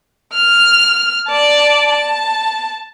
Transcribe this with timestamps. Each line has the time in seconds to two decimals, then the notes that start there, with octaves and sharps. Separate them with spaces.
0.35 F6
1.28 D5 A5
1.90 A5